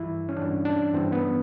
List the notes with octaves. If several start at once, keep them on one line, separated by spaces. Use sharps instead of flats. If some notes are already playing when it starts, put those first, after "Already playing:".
Already playing: G2 E3 E4
C#4
G2 E3 D4
D4
G2 E3 C4
B3